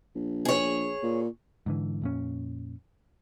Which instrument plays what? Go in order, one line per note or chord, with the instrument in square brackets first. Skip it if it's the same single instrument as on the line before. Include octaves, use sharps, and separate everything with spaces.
[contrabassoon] A#1
[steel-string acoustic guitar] G#4 C#5
[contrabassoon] A#2
[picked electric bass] G#2 D3 E3
F2 A#2 C#4